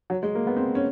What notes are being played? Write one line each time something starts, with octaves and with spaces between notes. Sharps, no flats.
F#3
G#3
A#3
B3
C4
C#4